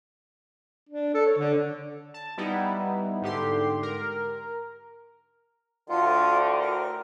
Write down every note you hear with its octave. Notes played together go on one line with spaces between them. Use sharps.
D4
A4
C#5
D3
A5
G3 B3 D#4 E4
G#2 D3 G4 C6
A#4
D2 A2 D3 F4
A#4